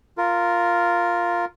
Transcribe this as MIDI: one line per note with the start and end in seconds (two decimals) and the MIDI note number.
0.18 1.45 65
0.18 1.45 70